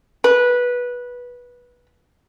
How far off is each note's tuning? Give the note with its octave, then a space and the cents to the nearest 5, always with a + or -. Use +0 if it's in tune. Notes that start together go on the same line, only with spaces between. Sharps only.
B4 -15